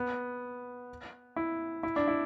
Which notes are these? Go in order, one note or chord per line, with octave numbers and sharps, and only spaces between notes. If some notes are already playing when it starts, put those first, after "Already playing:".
Already playing: B3
E4
E4
D4
E4